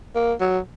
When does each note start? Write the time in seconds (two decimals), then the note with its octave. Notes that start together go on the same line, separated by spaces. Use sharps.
0.15 A#3
0.40 F#3